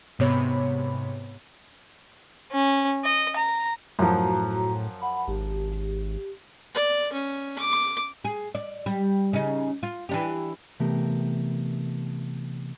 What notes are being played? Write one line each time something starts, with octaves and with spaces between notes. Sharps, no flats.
G#2 C3 B3 C#5 B5
C#4
D#5
A#5
F#2 A2 F3 F#4 A#5
F#5 B5
G#1 G4
D5
C#4
D6
G#4
D5
G3
C#3 D#4
F4
E3 D4 G4
C3 E3 A3 B3 G4 A#4